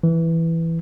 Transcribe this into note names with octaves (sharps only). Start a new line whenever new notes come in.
E3